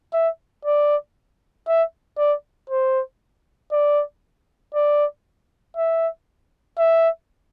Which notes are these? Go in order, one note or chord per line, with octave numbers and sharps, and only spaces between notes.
E5
D5
E5
D5
C5
D5
D5
E5
E5